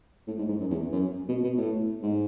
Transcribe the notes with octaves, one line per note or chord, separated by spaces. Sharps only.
A2
G#2
G#2
F#2
E2
F#2
B2
B2
A2
G#2